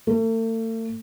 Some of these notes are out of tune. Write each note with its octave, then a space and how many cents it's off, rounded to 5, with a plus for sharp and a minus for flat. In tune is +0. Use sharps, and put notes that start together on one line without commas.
A3 +40